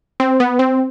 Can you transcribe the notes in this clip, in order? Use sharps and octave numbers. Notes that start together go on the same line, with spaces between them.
C4
B3
C4